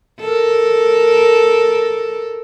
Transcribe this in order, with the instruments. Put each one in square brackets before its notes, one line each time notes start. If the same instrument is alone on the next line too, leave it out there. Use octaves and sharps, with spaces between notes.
[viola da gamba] A4 A#4